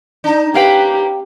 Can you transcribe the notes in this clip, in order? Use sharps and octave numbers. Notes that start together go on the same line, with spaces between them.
D4 D#4
A#3 C#4 G4 B4 F5 G5